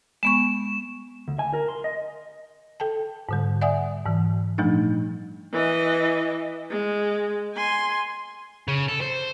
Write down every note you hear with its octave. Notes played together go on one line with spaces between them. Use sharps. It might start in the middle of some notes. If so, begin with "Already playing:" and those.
G#3 B3 C#6 E7
D2
G#5
A#4
C6
D#5
A4 G5 A5
G#2 D3 G3
D5 E5 F#5 G#5 D#6
G#2 E3
A#2 F3 G3 A3 D4 D#4
E3 D#5
G#3
G#5 C6
C#3
A4
C5